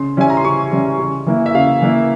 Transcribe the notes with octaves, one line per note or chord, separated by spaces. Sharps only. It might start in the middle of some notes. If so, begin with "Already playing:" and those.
Already playing: C#3 C6
E3 G3 C#4 E4 G#5
A#5
C6
C#3 C#6
E3 G3 C#4 E4
C#3
E3 A#3 E4
E5
C#3 F5
E3 A#3 E4